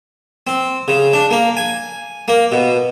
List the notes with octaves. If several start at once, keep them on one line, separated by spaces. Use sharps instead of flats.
C4
C#3
D4
A#3
G#5
A#3
B2